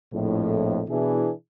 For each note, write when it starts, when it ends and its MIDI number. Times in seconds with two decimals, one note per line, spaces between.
0.13 0.82 34
0.13 0.82 41
0.13 0.82 45
0.89 1.31 47
0.89 1.31 52
0.89 1.31 62
0.89 1.31 64
0.89 1.31 68